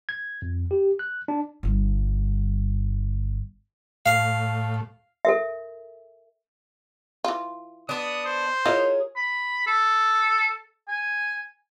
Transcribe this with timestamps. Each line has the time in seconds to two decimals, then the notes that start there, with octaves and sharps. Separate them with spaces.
0.09 G#6
0.42 F2
0.71 G4
0.99 F#6
1.28 D4
1.63 G1 G2
4.06 A2 F5
5.25 A4 A#4 E5
7.24 E3 F4
7.89 B3 D4 D#6
8.26 C5
8.65 E4 F4 G#4 A#4 C#5 D#5
9.16 B5
9.67 A4
10.88 G#5